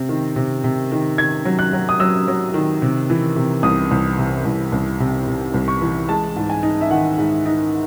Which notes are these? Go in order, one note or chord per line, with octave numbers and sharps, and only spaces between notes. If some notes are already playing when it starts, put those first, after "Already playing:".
Already playing: C3 C4
D#3
C3
C3
D#3
D#3 G#6
F#3
F#6
F#3
D#6
F#3 E6
F#3
D#3
C3
E3
C3
C2 D#6
C2
C3
C2
C2
C3
C3
C2
C#6
E3
G#3 A5
G#2
G#5
D#4
E5
D#3 F#5
G#2
D#4